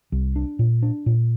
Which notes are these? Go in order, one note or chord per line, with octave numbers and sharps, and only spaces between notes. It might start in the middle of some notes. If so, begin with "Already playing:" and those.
C2
D4
A#2
D4
A#2